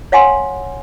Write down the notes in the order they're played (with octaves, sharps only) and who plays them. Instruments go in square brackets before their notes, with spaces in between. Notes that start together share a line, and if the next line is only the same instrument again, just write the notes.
[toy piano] C#5 F5 F#5 G#5 C6